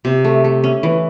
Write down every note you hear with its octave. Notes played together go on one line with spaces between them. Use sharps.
C3
A3
A3
C#4
E3